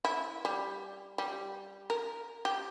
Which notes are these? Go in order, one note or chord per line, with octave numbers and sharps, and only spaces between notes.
E4
G3
G3
A#4
G4